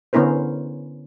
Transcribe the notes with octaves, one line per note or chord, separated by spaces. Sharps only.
D3 B3 C#4 E4 A#4 C5